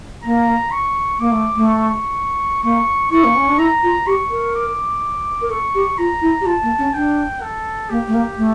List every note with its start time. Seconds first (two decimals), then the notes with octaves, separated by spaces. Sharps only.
0.24 A#3 A#5
0.71 C#6
1.19 A#3 D6
1.32 A3
1.56 A3
1.67 C#6
2.63 A#3 C#6
3.11 E4 C#6
3.24 A#3
3.36 C#4
3.48 D4
3.58 E4 A#5
3.83 F4
4.07 G4 C#6
4.30 A#4
4.55 D6
5.41 A#4
5.50 A4 C#6
5.75 G4
5.98 F4 A#5
6.21 E4
6.41 G4
6.46 F4 A5
6.62 A#3
6.78 C#4
6.94 D4 G5
7.41 A4
7.90 A#3 G4
8.07 A3
8.14 A#3
8.37 A3